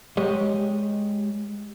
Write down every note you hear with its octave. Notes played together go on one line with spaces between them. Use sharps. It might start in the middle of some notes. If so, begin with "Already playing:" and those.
G#3 G4 C#5 D#5